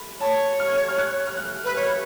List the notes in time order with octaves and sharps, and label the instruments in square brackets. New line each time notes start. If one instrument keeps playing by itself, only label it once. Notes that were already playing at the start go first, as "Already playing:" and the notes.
Already playing: [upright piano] B5
[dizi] C#5 [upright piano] A5
[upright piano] F6
F6
F#6
F6
F#6
[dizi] B4 [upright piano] F#6
[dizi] C#5 [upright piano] F6